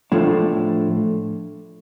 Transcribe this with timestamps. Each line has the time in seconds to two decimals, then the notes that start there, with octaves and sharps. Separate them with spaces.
0.12 A2 F3 A3 D4